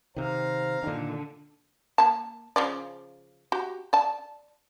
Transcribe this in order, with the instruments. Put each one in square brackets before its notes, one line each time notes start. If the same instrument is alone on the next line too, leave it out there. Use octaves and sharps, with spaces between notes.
[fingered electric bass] C3 D#3 [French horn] C5 [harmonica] F5 A#5
[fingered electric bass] A#2 D#3 [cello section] D3 [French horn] D4
[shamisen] A#3 A5
C#3 F3 D5
F#4 G4
D5 A5